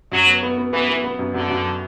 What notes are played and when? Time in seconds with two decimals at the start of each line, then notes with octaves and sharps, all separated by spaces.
0.12 F#2 F#3
0.27 B3
0.43 B3
0.58 B3
0.73 E3 B3
0.89 B3
1.04 B3
1.19 F#2
1.34 F#2 D3
1.49 F#2